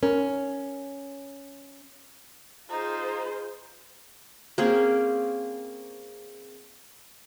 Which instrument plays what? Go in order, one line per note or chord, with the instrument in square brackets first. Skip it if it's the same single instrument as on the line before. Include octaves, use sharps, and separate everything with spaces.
[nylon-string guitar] C#4 [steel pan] A#4
[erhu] D#4 [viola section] F4 G#4 C5
[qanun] A#3 C4 C#4 G#4